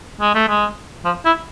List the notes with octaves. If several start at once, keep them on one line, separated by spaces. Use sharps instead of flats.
G#3
A3
G#3
F3
E4